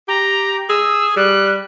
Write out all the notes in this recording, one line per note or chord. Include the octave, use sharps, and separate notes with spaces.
G4 A#5
G#4 E6
G3 F#6